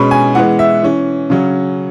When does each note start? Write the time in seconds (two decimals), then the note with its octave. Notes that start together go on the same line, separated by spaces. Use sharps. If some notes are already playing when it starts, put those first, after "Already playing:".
Already playing: B2 G#3 C#4 B5
0.11 G#5
0.35 E3 G#3 B3 F#5
0.59 E5
0.82 E3 C#4
1.30 C#3 F#3 C#4